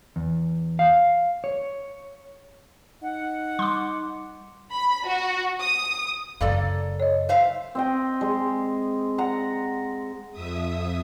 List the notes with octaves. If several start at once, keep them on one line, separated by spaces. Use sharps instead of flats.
E2
F5
C#5
D#4 F#5
G3 C6 D6
B5
F#4
D#6
F#2 C#3 A#3 A4 D5
C#5 D#5
C5 E5 F5
C4 D#5 G5
G#3
F#5 A#5
F2 E5 D#6